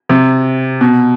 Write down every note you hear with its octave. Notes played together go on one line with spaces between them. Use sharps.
C3
B2